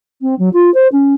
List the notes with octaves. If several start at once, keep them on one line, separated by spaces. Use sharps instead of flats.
C4
F#3
F4
C5
C#4